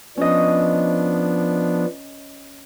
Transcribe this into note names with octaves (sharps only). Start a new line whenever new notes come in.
F3 B3 C#4 D4 D#5